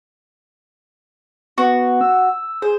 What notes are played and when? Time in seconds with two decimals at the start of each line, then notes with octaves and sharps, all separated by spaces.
1.58 B3 F#4
2.01 E6
2.62 G#4 C5